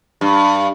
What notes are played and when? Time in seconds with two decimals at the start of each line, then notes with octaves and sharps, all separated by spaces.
0.21 G2